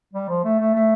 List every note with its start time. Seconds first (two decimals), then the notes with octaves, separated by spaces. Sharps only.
0.13 G3
0.29 F3
0.44 A3
0.59 A3
0.75 A3